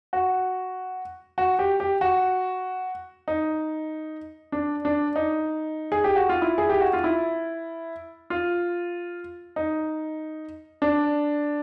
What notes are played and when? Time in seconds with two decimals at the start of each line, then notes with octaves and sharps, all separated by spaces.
0.13 F#4
1.38 F#4
1.59 G4
1.80 G4
2.01 F#4
3.28 D#4
4.52 D4
4.85 D4
5.16 D#4
5.92 G#4
6.04 G4
6.16 F#4
6.29 F4
6.42 E4
6.58 G#4
6.69 G4
6.81 F#4
6.93 F4
7.04 E4
8.30 F4
9.56 D#4
10.82 D4